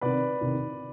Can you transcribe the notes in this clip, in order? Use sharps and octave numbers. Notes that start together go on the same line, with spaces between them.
C3 D#3 B4 D5
C3 D#3